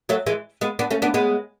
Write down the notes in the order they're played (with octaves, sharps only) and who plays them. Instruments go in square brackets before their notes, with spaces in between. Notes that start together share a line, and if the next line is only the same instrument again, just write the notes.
[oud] F#3 A3
E3 G#3
G#3 B3
B3 D4
A3 C#4
B3 D4
G#3 B3